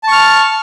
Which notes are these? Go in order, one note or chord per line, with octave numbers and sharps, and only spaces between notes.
A5 C#6 F6